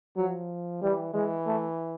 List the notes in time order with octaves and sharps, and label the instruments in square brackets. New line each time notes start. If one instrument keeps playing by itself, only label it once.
[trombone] F3 [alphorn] F#3
[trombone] E3 [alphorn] G3
[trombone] E3 [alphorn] G#3
[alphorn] A3